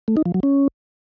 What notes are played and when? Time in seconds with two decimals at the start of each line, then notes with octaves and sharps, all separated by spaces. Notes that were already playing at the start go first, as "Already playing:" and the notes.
0.08 A3
0.17 D#4
0.26 F3
0.34 F#3
0.43 C#4